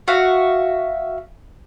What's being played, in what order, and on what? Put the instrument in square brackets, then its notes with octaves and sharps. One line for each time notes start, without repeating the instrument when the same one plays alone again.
[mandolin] F#4 E5 F5